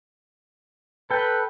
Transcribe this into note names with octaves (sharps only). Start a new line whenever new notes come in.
A4 B4 G5